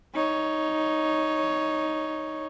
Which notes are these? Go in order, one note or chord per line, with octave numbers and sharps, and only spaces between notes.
D#4 C#5